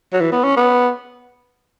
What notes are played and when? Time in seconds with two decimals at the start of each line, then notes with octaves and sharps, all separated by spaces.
0.13 F#3
0.20 E3
0.32 B3
0.44 C#4
0.56 B3